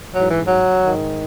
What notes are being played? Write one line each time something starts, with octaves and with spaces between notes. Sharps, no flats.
G#2 E3 F#3
E3
F#3
G#2 D#3